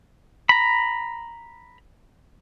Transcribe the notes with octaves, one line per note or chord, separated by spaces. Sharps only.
A#5 B5